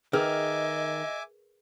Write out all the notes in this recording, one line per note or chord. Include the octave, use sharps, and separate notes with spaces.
D#3 G#4 A#4 B4 D#5 E5 G#5 D6